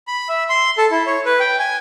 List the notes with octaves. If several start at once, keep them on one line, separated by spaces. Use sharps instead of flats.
B5
E5
C6
A4
E4
C#5
B4
G5
G#5